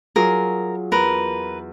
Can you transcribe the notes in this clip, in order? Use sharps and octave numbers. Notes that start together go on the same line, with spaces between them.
F#3 F4 G#4 A#4
E2 A#4 B4